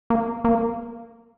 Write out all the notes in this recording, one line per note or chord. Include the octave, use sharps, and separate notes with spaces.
A#3
A#3